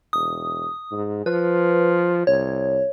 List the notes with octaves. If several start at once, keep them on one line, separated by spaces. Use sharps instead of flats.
E1 D#6
G#2
F3 B4
C2 C#5